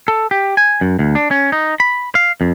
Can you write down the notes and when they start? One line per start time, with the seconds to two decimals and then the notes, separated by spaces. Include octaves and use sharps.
0.08 A4
0.31 G4
0.57 G#5
0.81 F#2
0.99 D2
1.15 D4
1.31 C#4
1.52 D#4
1.80 B5
2.15 F5
2.41 F2